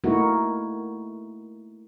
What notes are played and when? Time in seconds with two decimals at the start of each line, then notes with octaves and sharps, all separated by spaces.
0.04 A3 A#3 D#4 E4 F#4 A#4